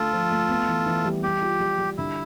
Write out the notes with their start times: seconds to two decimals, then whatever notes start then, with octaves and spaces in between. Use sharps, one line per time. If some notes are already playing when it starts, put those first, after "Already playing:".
Already playing: D3 A3 F4 A4
0.13 F3
0.31 A3
0.49 B3
0.68 E3
0.86 E3
1.05 G3
1.23 G3 G4
1.42 F4
1.60 G3
1.78 G3
1.98 D3 E4